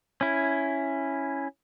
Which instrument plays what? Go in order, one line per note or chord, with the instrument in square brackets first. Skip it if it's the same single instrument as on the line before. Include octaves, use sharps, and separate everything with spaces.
[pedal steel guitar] C#4 E4